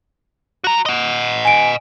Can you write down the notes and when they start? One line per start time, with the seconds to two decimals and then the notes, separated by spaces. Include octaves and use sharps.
0.64 F#4 A#5
0.86 D#5 F#5
1.45 G#5 D7